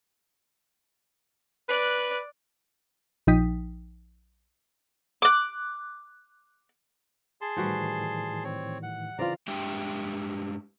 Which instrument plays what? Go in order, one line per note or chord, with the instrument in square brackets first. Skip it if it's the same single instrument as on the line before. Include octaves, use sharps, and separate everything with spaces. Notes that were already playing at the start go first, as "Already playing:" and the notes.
[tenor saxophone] B4 [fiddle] D5 F#6
[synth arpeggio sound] A#1 F3 D#4 G5 D#6 B6
[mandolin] D6 F#6
[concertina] G#4 A5 C6
[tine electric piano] A2 D#3 E3 [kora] G3 F#4 C5
[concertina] C4 C#5
F#5
[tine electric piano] C#3 E3 [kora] C4 F4 [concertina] D5 A#5
[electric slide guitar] G2 G#3 D4 G4 E5 G5